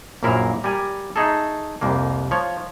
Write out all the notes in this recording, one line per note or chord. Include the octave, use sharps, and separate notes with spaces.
A#1 F#2 A#2 E4 A#4 F5
G3 A#4 G#5
A3 D#4 G#4 A4
C2 F2 A#3
F3 C#5